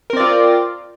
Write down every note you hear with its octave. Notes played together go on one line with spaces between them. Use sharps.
C4 F4 A#4 D5